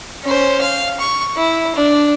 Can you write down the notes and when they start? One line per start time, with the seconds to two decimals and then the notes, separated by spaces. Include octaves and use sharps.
0.24 C#4 C5
0.61 F5
1.00 C#6
1.37 E4
1.75 D4